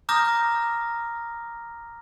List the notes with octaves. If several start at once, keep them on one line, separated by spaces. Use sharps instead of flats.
A#5 D6 D#6 F6 G6 A#6